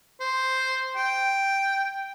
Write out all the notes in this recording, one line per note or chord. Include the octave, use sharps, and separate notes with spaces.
C5
G5